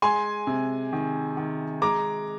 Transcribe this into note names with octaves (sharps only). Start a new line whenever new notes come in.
G#3 G#5 C6
C3
D#3
D#3
G#3 A#5 D6